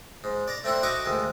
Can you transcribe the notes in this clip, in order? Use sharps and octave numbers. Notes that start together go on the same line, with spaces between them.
G#2
D5 A#5
A3 C4 D4 E4 F#5
D#4 F#4 E5 A#5 C#6 D6
D2 G#2 D#3